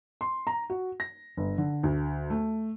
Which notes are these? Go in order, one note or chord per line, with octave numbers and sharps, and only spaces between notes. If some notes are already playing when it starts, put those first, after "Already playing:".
C6
A#5
F#4
A#6
G1
D3
D2
A3